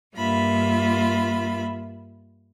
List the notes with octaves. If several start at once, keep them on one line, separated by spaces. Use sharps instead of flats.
G2 A#3 F4 E5 B5